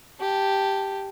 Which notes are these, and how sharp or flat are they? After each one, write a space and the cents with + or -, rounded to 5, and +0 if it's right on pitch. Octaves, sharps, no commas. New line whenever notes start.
G4 +0 A5 +0